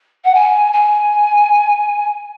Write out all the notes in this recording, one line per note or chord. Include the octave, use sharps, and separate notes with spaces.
F#5
G#5
G#5